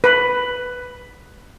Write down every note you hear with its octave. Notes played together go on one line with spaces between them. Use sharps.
B4